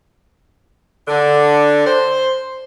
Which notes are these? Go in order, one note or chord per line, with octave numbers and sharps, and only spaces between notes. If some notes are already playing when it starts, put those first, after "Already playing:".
D3
C5